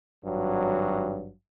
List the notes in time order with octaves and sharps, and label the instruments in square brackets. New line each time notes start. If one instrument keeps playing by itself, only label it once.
[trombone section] G#1 G2 F#3